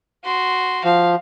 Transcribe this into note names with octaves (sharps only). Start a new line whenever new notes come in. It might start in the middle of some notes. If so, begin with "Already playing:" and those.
F#4 C6
F3 F5